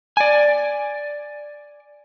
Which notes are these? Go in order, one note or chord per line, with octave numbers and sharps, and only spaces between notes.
D5 G#5